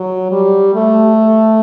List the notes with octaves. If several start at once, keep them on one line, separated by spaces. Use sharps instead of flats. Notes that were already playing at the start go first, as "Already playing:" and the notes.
Already playing: F#3
G3
A3